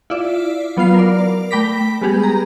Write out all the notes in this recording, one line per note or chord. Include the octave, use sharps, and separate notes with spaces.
E4 F4 D5 E5
F#3 B3 F4 F5 C7
A#4 D5
A3 G5 B5 D6 A#6 B6
G3 G#3 B3 G4 G#4
A#5